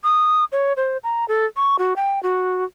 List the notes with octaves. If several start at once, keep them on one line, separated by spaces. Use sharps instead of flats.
D#6
C#5
C5
A#5
A4
C#6
F#4
G5
F#4